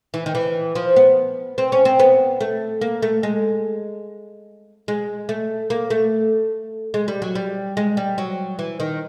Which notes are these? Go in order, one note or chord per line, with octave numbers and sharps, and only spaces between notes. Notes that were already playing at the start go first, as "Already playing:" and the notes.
E3
D#3
E3
F3
B3
C4
C#4
C4
B3
A3
A#3
A3
G#3
G#3
A3
A#3
A3
G#3
G3
F#3
G3
G#3
G3
F#3
E3
D#3